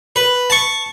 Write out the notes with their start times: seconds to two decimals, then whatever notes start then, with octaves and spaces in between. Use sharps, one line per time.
0.16 B4
0.50 A5 C#6